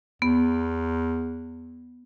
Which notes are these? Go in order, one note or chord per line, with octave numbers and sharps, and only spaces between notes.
E2 B3